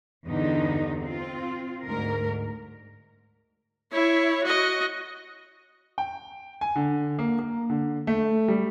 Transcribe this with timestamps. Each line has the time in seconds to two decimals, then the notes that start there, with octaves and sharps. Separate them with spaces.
0.27 E2 G2 D3 D#4
1.02 C4 F4
1.86 D2 G#2 A#4
3.92 E4 C#5
4.44 F#4 D#5
5.98 G5
6.61 G#5
6.75 D3
7.19 A#3
7.39 A#3
7.70 D3
8.07 A3
8.48 G3